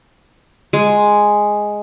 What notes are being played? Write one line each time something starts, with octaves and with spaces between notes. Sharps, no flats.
G#3